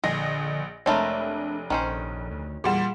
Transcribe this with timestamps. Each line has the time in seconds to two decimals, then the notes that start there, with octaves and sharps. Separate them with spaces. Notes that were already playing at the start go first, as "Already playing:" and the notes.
0.04 A#1 D3 G#4 D#5 A#6
0.86 F1 G#3 A3 D4 A#4 C#5 E5 B5
1.70 A#1 D#3 C#4 C5
2.31 D2
2.64 E2 A#2 G3 G#4 F#5 E7